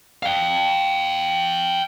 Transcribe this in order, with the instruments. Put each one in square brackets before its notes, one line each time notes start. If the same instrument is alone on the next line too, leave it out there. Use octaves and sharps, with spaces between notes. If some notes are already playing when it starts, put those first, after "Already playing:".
[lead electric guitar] F5 G5